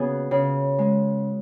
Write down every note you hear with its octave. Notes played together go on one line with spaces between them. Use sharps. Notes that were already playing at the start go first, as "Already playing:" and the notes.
Already playing: C#3 B3 F#4 G#4
C#3
G#3